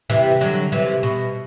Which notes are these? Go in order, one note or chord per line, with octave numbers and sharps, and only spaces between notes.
C3 E3
D3 F#3
C3 E3
B2